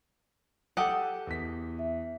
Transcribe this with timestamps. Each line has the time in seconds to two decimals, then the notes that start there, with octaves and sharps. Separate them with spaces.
0.77 G4 A4 F#5 D#6
1.27 E2 B6
1.79 E5